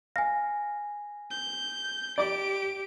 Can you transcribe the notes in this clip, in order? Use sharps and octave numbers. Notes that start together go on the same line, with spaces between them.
F5 G#5 A#6
G6
G4 D5 D6 D7